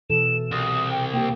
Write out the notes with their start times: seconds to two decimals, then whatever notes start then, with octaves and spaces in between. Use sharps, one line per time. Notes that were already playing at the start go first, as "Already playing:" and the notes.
0.10 B2 E3 A4 E7
0.52 C2 D#6
0.91 G5
1.14 A#3 G4 G5